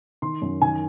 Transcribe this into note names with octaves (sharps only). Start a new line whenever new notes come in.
D#3 C6
F#2
D#3 G#5